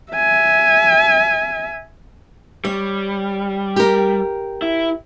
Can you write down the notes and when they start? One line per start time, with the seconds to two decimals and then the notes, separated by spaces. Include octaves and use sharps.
0.13 E5 G#5
2.65 G3 C#5
3.76 G4 A#4
4.62 E4